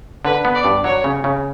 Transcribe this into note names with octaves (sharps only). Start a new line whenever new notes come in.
D3 B4
B3
D5
G2
F#3 C#5
C#3
C#3